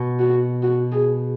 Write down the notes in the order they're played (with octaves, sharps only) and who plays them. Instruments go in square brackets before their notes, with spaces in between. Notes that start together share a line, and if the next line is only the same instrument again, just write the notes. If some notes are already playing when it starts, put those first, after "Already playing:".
Already playing: [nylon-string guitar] B2
[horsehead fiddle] F#4
F#4
G#4